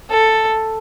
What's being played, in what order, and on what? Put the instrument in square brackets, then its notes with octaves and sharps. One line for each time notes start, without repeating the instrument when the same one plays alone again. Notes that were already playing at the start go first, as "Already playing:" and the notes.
[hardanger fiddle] A4